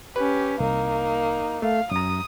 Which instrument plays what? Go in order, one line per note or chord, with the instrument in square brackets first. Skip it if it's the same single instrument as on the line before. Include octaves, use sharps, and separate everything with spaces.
[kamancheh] C#4 G4 [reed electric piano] B4
[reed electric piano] C2 [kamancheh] A#3 D#4
[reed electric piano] A3 [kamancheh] F5
[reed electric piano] F#2 A#5 [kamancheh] D#6